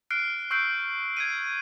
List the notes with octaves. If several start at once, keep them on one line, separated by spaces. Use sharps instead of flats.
F6 F#6 C7 D7
C#6 E6 G6 C7 D7
G#6 C7 D#7